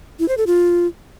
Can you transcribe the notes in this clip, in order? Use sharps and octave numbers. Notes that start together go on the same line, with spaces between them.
E4
C5
A4
F4